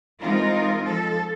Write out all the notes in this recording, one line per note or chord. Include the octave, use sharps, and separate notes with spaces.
E3 G#3 C4 D#4 F4 A#4
F3 A4